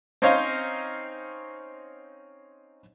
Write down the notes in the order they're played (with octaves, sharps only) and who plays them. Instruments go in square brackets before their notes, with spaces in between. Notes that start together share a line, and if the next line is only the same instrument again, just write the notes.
[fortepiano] C4 C#4 D#4 C5 C#5 F5